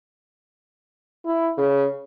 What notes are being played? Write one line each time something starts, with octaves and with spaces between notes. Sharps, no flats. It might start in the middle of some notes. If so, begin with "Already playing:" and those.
E4
C#3